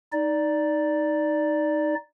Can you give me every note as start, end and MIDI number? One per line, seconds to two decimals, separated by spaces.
0.13 1.95 63
0.13 1.95 74